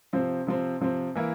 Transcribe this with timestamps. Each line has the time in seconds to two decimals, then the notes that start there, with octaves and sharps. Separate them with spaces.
0.13 C3 F3 C4
0.47 C3 F3 C4
0.80 C3 F3 C4
1.15 E3 A#3 E4